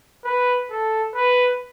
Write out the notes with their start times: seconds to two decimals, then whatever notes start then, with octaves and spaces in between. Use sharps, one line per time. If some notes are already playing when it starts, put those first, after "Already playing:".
0.25 B4
0.71 A4
1.15 B4